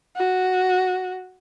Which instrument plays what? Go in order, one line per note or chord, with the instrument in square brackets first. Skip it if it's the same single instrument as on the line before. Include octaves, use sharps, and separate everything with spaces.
[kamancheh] F#4